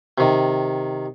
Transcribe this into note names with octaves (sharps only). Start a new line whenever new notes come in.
C3 D#3